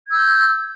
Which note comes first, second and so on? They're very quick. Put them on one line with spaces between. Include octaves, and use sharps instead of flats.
G#6 E6 G6